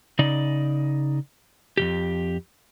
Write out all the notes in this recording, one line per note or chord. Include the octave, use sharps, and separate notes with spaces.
C#3 D#4 D5
F2 C3 G4